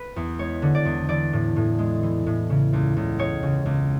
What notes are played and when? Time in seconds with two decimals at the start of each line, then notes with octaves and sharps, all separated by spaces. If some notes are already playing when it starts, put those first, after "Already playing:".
Already playing: B4
0.16 E2
0.39 G#3 C#5
0.62 D3
0.75 D5
0.85 E2
1.09 E3 D5
1.33 A2
1.56 A2
1.79 G#3
2.03 E3
2.26 A2
2.50 C#3
2.73 C#2
2.96 C#2
3.19 G#3 C#5
3.43 C#3
3.66 C#2